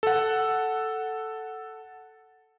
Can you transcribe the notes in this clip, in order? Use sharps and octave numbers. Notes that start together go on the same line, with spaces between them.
A4 F#5